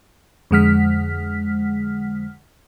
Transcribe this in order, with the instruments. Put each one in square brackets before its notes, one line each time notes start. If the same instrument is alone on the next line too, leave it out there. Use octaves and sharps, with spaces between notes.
[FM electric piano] F2 D3 G#3 F#5 F6 B6